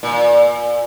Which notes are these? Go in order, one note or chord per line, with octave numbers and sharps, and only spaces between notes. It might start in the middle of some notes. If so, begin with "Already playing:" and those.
A#2